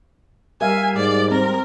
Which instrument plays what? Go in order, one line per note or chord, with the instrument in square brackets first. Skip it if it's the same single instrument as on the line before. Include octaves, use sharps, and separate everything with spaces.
[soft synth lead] G3 [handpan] A#4 E5 F5 [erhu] G#5
[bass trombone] G#2 [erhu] D5
[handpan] C4 [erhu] A#4